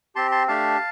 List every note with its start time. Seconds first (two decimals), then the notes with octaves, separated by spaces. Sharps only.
0.16 C4 G4 A5 C6
0.32 A5 C6
0.48 A3 D4 G4 F5 A5